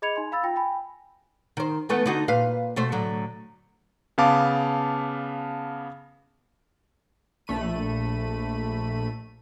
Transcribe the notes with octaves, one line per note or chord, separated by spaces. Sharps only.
G#4 D#5 B5 G#6 C#7 F7
D#4 G#5 C6
F5 B5 E6 A6
F4 G5 A#6
G5 G#5 B5
D#3 C5
E3 A3 B3
D3 D#4 F#4
A#2 B4 F5
B2 A3 C5
A2 D3 F#3
C#3 B3 F5 A5 D6
A#1 A3 B5 D#7